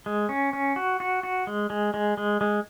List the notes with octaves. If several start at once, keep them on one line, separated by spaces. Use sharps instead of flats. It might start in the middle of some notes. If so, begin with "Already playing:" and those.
G#3
C#4
C#4
F#4
F#4
F#4
G#3
G#3
G#3
G#3
G#3